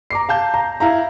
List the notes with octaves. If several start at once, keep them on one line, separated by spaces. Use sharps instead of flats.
A#5 D6 C7
F5 A5 G6
A#5
E4 F5 A#5